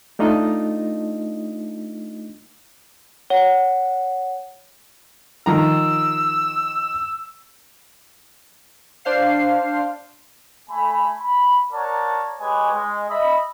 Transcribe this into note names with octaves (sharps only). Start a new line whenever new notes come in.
A3 D4 D#4 F4 D#5
C#5 F#5
D#3 F3 A#5 E6
D4 C5 F5 C7
A3 G#5 B5
B5
A#4 C#5 D5 F#5 A5 A#5
G#3 G4 B4 C#5 D#5 G#5
G#3
D#5 E5 B5